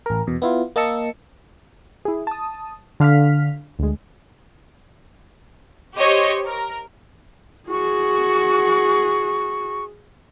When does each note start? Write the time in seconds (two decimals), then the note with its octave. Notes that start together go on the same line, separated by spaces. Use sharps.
0.06 A1 A#4
0.27 E2 B2
0.42 B3 E4 F4
0.76 A#3 D#5 A5 E6 C#7
2.05 E4 G#4
2.27 A5 D#6
3.00 D3 F5 F6 B6
3.79 D2 G#3
5.97 G4 C5 C#5 D#5
6.46 A#4
7.70 F#4 G#4 C#6